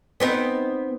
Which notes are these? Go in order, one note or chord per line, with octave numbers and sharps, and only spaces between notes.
B3 C4 D#4